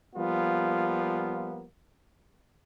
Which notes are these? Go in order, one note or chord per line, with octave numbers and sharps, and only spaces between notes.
F3 G3 A#3 B3 F4